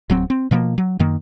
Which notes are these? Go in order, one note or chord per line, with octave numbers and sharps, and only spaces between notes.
D1 F#3 C4
C4
B2 F3 G3 A#3
F#3
F#2 D#3 A#3